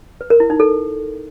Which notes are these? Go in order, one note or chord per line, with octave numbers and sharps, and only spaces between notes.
B4
A#4
E4
D#4
A4